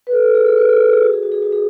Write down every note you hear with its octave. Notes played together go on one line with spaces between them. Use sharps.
B4
A4
A4
G#4
A4
B4
A4
A4
G#4
F#4
G#4
F#4
G#4
F#4
G#4